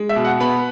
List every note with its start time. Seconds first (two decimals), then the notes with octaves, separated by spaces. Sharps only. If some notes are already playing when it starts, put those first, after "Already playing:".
Already playing: G#3
0.09 E5
0.16 B2
0.25 F#5
0.40 B3 B5